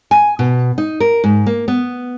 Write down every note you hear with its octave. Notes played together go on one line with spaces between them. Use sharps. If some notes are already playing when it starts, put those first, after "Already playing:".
G#5
B2
D#4
A#4
G#2
A#3
B3